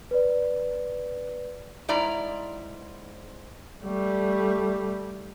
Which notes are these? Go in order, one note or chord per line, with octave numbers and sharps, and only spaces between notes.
B4 D5
G#2 E4 D5 A#5
G3 A3